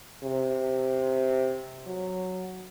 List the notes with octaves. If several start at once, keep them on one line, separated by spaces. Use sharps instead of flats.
C3
F#3